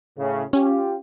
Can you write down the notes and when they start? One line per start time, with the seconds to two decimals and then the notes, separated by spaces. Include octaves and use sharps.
0.18 A2 C#3
0.53 C#4 F4 G4